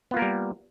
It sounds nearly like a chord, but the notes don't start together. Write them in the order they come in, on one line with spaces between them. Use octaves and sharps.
B3 F4 A#3 A#4 G3